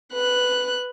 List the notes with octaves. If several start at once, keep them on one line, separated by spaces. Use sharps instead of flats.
B4 F#6